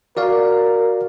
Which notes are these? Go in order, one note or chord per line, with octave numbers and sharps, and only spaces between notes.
F#4 A#4 D5 F5